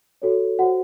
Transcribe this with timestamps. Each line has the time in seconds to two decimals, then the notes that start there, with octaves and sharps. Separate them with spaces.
0.22 F#4 A4 C#5
0.59 F#4 C5 F#5